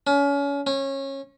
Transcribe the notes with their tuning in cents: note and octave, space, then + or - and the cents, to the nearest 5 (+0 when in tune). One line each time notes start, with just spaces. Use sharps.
C#4 +30
C#4 -25